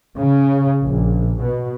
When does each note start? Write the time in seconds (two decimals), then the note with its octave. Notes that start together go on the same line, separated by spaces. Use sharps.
0.19 C#3
0.84 A#1
1.41 B2